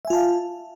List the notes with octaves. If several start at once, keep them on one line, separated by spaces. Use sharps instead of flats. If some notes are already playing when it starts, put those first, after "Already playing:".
F4 E5 F5 G#5 A5